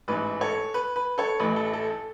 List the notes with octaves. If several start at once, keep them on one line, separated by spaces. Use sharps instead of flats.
A1 G#2 E3 B4
A4 C#5
B4
B4
A4 C#5
A1 A2 E3 B4
A4
A4
A4